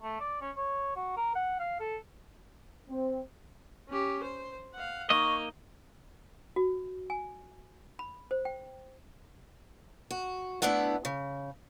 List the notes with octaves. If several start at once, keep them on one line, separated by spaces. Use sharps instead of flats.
A3
D5
C#4
C#5
F#4
A#4
F#5
F5
A4
C4
C#4 G4
C5
F5 F#5
A#3 D#4 D#5 C#6
F#4
G#5
B5
C5
G5
F#4
A3 B3 D4 E4 F#5
C#3